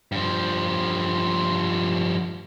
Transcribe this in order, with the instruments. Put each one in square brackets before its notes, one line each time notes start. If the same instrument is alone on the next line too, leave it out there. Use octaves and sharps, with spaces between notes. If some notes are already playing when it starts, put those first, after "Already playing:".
[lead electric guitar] G2 F3